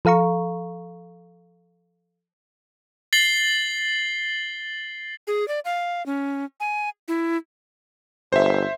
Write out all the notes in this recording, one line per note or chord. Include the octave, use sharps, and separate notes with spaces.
F3 A4 F5 A#5 C#6
A6 C7 F#7 G7
G#4
D5
F5
C#4
G#5
E4
G1 C5 E5